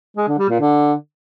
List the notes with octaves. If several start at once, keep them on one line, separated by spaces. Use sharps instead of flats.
G#3
D3
G3
A#2
D3